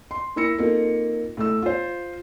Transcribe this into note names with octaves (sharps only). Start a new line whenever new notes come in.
C6
A#3 E4 B5 E6 A#6 C#7
A#3 C4 D#4 F4 A4
A2 A3 E6
F4 C5